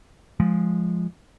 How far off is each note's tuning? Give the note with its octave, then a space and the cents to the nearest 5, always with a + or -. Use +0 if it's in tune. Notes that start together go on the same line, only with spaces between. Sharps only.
F3 +0 G#3 +0